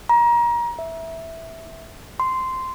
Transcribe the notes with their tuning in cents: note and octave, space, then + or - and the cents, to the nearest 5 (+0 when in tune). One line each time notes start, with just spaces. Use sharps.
A#5 +30
E5 -5
C6 -10